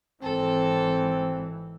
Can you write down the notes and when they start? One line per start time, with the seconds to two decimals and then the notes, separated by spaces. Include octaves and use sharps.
0.23 G#1 E3 C4 A4